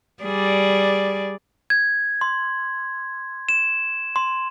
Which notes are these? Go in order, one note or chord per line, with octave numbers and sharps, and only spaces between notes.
G3 G#4 D5
G#6
C6
E7
C6